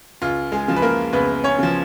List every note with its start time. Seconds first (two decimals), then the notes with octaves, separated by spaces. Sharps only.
0.22 C#2 F4
0.52 G#3 G#4
0.68 C#3 F3
0.76 B4
0.82 A#3 A#4
1.13 C#2 B3 B4
1.44 C#4 C#5
1.59 C#3 F3